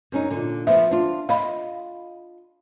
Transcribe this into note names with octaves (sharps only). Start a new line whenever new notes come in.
F#2 C#4 D#4
A#2 D3
F3 B3 E5
D4 F4
F4 D#5 F5 B5